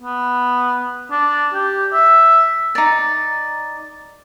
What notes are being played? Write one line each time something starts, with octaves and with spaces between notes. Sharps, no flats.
B3
D4
G4
E5
D#4 D5